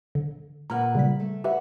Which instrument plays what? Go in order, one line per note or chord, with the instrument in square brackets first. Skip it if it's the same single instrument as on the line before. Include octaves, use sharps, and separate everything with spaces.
[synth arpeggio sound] D3
[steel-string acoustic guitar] A#2 B4 F#5 [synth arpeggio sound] A#5 F6
[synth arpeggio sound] C#3 G3 B6
[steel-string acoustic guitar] A3
[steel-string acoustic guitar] F#4 [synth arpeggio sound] G4 B4 E5